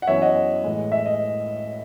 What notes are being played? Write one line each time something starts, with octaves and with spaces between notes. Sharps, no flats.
F#5
F#2 E3 B3 C#5 E5
D#5 F#5
A2 E3 G#3
E5
D#5